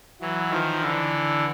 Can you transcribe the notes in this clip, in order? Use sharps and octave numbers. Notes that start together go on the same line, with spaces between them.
E3 F#3
D#3 F3
D3 E3